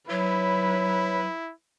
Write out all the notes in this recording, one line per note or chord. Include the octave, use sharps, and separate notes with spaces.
F#3 E4 B4 C#5